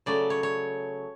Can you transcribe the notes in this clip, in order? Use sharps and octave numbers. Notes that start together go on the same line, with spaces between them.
C#3 F#3 A3 D5
C#5
C#5